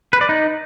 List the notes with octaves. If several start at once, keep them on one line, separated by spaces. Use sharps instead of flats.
B4
D5
D#4